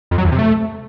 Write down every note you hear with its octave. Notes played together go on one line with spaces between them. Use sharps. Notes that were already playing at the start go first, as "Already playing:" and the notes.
F2
F#3
E2
C3
A3